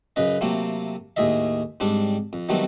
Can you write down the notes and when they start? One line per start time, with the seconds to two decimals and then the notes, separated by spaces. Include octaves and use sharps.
0.16 F#2 C#3 B4 D#5
0.41 C3 F#3 A3 A#3 C4
1.16 D#2 A2 G#4 D#5 E5
1.80 G#2 G3 C4 D4
2.33 F2
2.49 D#3 F#3 G3 A3 B3 C4